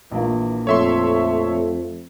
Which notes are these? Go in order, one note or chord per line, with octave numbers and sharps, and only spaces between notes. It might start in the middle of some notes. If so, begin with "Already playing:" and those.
A#1 E3 A#3
F2 A3 C#5 E5 C6